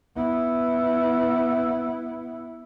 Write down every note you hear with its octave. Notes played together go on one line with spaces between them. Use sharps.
B3 E4